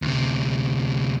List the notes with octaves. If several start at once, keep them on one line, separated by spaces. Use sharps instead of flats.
D2 C3